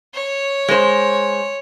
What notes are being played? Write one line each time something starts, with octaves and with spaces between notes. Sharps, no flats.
C#5
G#3 C5